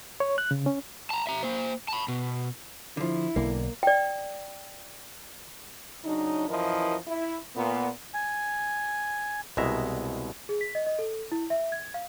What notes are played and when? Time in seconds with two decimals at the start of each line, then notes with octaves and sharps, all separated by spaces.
0.20 C#5
0.38 F#6
0.51 C#3
0.66 C#4
1.10 A5 A#5
1.27 E5 A#5
1.43 A#3 C5
1.88 A5 B5
2.08 B2
2.97 D3 F3 E4
3.36 B1 D3 A#3
3.83 D5 G5
6.05 C#3 F#3 D4 D#4
6.48 F#2 E3 F3 E4 A#4 D#5
7.08 E4
7.55 A#2 B3
8.14 G#5
9.57 C2 B2 G#3 E5 A#5
10.49 G#4
10.61 B6
10.75 D#5
10.87 D#5
10.99 A4
11.32 E4
11.50 E5
11.72 G#6
11.94 F5